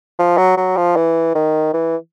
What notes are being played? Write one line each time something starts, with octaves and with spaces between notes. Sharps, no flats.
F3
F#3
F#3
F3
E3
D#3
E3